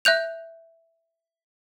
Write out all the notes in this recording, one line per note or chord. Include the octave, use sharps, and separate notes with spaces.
E5 F#6 G6 F7